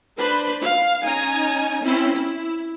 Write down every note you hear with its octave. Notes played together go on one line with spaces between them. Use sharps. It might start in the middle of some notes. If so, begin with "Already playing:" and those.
D4 B4 C5 B5
F5
C#4 D#4 G#5 A#5
C4 C#4 E4
E4